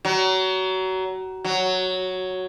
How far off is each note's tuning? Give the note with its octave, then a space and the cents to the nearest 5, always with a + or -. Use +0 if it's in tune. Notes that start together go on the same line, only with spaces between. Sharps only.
F#3 +25
F#3 +0